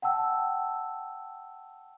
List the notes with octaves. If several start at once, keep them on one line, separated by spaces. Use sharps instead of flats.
F#5 G5 A5 E6